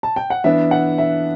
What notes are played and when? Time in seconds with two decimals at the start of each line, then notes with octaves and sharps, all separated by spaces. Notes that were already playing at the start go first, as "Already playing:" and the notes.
0.03 A5
0.16 G5
0.30 F#5
0.44 E3 B3 D4 E5
0.71 F#5
0.98 E5